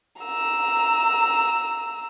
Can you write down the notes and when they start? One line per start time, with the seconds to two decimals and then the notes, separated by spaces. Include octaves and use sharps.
0.22 A#5 E6